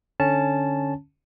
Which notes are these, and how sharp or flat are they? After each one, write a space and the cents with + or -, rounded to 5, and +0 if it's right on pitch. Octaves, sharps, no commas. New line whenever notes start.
D3 +0 C#4 -5 A5 -5